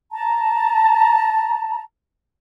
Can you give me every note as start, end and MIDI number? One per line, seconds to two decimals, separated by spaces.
0.12 1.82 81
0.12 1.82 82